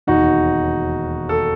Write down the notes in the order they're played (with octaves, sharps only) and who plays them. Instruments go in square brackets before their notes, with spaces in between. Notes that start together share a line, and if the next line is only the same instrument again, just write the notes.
[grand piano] E1 D#2 D#3 D#4 F#4
A4